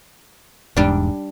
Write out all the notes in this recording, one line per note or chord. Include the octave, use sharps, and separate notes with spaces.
E1 E2 G#2 G3 D4